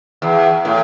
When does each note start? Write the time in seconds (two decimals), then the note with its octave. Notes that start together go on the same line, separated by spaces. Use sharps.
0.22 E2
0.65 A2